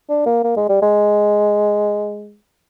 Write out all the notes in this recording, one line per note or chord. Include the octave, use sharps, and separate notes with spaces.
D4
A#3
A#3
G#3
G3
G#3